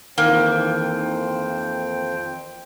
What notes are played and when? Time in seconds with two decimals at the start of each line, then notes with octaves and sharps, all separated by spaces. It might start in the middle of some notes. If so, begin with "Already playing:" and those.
0.18 F2 D#3 E3 A#3 C5 G5